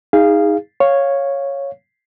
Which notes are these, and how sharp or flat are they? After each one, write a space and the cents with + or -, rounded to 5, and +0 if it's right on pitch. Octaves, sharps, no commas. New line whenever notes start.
D#4 +20 G#4 -20 F5 -15
C#5 -5 F5 +0